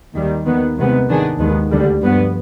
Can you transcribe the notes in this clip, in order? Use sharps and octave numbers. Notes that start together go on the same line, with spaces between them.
D#2 D#3 G3
D#2 D#3 B3
C2 C3 D#3 G#3 B3
G#2 D#3 B3 D4 G#4
D#2 D#3 G#3 B3
D2 D3 G3
G2 F3 B3